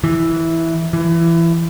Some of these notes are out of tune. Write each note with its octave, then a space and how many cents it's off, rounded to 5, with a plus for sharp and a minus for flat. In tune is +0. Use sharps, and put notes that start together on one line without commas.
E3 -5
E3 +20